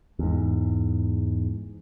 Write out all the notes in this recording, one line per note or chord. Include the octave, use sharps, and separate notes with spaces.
E2 G#2